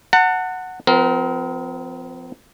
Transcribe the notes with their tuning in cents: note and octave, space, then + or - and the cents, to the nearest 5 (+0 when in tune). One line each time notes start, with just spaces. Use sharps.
F#5 +0 A5 +40
F3 +10 C4 -40 A#4 +15